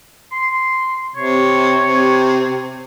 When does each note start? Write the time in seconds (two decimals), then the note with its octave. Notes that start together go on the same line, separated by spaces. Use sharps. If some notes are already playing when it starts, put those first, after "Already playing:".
0.32 C6
1.16 C3 C#5
1.80 C3